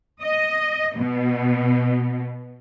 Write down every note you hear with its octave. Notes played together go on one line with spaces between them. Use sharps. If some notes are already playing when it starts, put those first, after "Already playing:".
D#5
B2